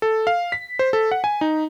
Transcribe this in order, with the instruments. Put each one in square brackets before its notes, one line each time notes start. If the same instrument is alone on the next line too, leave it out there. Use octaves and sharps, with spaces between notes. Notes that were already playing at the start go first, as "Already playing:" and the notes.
[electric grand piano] A4
F5
B6
C5
A4
F#5
G#5
D#4